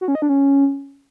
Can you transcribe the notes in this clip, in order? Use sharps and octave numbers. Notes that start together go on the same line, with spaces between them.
F#4
C#4
D#5
D4
C#4